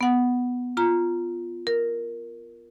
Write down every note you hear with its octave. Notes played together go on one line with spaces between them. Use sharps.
B3 F#5
F4 A#5
A#4